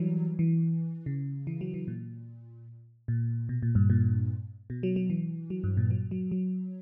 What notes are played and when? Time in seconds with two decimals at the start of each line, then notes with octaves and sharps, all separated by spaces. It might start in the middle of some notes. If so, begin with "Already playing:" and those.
Already playing: E3 F#3 G3
0.39 E3
1.06 C#3
1.47 E3
1.61 F#3
1.74 E3
1.88 A#2
3.08 A#2
3.49 B2
3.63 A#2
3.75 G2
3.90 A#2
4.70 B2
4.83 F#3
4.96 F#3
5.10 E3
5.50 F#3
5.64 G2
5.77 A#2
5.90 F#3
6.11 F#3
6.32 F#3